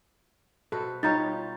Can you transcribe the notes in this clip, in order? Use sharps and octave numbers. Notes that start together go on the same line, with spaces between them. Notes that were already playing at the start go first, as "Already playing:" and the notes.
B2 A4 B4 C5
G3 D#4 F4 C#5 A#5 G6 A6